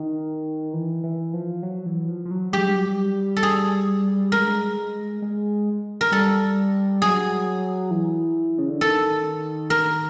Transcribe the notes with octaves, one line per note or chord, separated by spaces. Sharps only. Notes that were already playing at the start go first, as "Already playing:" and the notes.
Already playing: D#3
E3
E3
F3
F#3
E3
F3
F3
F#3
G#3 G4
G3
F#3
G3
A4
G#4
G#3 A#4
G#3
A#4
G3 A4
F#3 G#4
E3
C#3
D3
D#3 A4
A#4